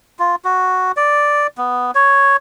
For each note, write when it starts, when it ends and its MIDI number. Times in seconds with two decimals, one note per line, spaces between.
0.19 0.36 65
0.45 0.92 66
0.97 1.47 74
1.58 1.91 59
1.95 2.37 73